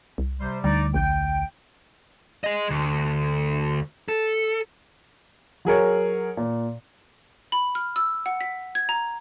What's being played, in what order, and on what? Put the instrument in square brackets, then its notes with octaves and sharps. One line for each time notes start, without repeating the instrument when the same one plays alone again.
[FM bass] C2
[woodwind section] C3 G3 C5
[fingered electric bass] D2 [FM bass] G3 [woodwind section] D#4 D5
[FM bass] A#1 [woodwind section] G5
[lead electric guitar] G#4 D#5
D2
A4
[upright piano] F#3 G#4 A#4 C#5
A#2
[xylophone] B5
F6
E6
F#5
B6
G#6
A#5